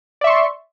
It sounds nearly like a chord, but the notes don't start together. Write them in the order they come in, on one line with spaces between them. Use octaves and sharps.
D5 E5 C#6 C6